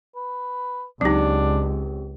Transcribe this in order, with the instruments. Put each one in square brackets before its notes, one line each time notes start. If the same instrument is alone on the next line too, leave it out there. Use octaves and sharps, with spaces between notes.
[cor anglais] B4
[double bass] C#2 [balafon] F#3 D#4 [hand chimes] C4 G4 [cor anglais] D4